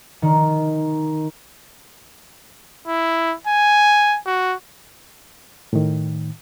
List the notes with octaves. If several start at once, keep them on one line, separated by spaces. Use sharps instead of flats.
D#3
E4
G#5
F#4
A2 D#3